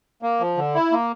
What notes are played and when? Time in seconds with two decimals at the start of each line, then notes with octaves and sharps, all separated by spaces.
0.22 A#3
0.40 F3
0.57 D3
0.75 E4
0.92 A#3